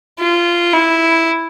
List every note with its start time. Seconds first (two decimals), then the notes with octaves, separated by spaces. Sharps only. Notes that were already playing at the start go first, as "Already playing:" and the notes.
0.19 F4
0.73 E4